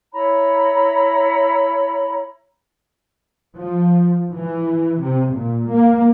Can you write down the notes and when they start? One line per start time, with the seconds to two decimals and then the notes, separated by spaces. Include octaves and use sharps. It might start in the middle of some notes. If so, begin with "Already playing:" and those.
0.13 E4 C#5 A#5 B5
3.56 F3
4.34 E3
5.01 C3
5.34 A#2
5.71 A#3